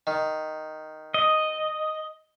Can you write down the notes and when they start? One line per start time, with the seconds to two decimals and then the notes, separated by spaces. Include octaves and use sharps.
0.07 D#3
1.14 D#5